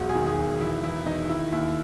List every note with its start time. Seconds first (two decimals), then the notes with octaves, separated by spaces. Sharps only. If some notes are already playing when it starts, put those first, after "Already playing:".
Already playing: E1 B1 F#4
0.09 G#4
0.15 D#3
0.26 G#4
0.38 E1
0.60 E3 E4
0.84 E3 E4
1.06 E3 D#4
1.29 D#3 E4
1.52 D#2 E4